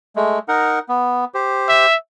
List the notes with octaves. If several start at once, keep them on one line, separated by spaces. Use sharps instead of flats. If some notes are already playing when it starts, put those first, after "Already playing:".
G#3 A3
D#4 A#4 F#5
B3
G4 C5
E5